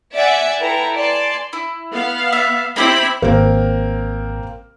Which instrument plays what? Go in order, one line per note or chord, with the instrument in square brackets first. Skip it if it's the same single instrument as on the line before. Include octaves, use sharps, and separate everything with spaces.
[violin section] D5 E5 F#5 G#5
E4 A4 B4 G5 A#5
D5 G#5 A5 C6
[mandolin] E4
[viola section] B3 F5
[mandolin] E5
[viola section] C4 E4 B5 [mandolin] D#4 G4 C5
[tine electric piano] G#1 [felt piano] A#3 C4 A#4